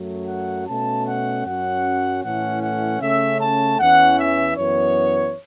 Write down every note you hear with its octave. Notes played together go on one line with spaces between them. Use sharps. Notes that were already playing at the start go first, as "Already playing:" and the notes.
Already playing: F#2 F#3 A3
F#5
B2 A3 C#4 A5
F#5
F#2 F#3 C#4 F#5
A2 E3 A3 C#4 F#5
F#5
C#3 A3 C#4 E5
A5
E2 E3 C#4 F#5
E5
F#2 E3 B3 C#5